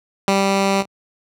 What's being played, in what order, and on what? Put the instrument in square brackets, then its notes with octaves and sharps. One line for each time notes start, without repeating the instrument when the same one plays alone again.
[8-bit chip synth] G3